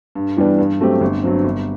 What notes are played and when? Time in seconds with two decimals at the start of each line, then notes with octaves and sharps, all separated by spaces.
0.15 G2
0.37 E3 G3 B3 D4
0.58 G2
0.80 F#3 A3 C4 G4
1.01 G1
1.23 G2 F#3 C4
1.44 G1